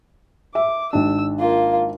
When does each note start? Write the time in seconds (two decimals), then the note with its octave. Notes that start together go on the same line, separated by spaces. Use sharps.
0.55 E5 D6
0.93 G#1 D4 E6
1.39 A#3 F4